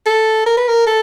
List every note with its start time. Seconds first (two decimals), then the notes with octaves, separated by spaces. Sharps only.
0.06 A4
0.46 A#4
0.57 B4
0.68 A#4
0.87 A4